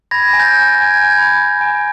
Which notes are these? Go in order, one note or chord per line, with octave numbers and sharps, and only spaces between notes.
B5 G#6 A#6
G#5
G6 A6
G#5
A6
G#5
G#6
G#5 G6
G#6
B5
B5
G#5